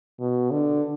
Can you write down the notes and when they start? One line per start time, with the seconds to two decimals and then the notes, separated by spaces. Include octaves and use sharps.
0.20 B2
0.51 D3